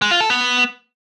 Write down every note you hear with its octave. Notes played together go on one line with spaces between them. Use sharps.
G#3
F4
A4
B3